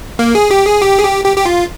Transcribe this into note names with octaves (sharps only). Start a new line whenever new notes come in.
A#3
G#4
G4
G#4
G4
G#4
G4
G4
G4
F4